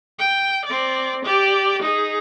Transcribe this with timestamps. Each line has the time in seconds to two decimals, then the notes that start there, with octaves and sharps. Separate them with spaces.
0.19 G5
0.65 C4 D5
1.25 G4 D5
1.83 D#4 G#4